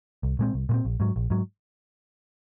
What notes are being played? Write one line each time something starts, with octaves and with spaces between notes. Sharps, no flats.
C2
A#2 G#3 C4
C2
A#2 G#3 C4
A#1
G#2 F#3
A#1
G#2 F#3